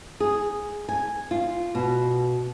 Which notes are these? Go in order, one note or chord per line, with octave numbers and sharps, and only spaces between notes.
G#4
G#5
F4
B2